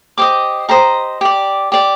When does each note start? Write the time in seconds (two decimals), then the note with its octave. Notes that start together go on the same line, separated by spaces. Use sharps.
0.18 G4 C5 D#5 D6
0.69 G4 C5 D#5 A#5
1.21 G4 D5
1.72 G4 D5